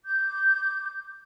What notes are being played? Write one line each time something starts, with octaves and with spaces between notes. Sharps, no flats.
D6 G6